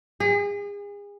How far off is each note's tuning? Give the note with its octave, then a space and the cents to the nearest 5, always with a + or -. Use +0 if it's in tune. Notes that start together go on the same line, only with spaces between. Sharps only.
G#4 -35